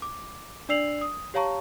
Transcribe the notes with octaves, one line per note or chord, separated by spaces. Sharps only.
D6
D4 D5 E6 C7 F7 F#7
D#6
G4 C#5 F5 A5 A#5 C#6